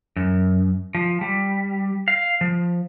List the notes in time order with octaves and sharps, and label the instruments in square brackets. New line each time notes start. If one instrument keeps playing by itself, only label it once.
[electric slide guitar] F#2
F3
G3
F5
F3